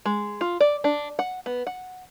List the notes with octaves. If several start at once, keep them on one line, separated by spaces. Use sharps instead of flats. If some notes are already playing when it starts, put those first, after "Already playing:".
G#3
F4
D5
D4
F#5
B3
F#5